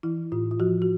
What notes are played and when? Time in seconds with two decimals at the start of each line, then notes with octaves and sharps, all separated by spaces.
0.03 E3 E4
0.32 A2 F4
0.51 F4
0.60 F3 F#4
0.82 F#4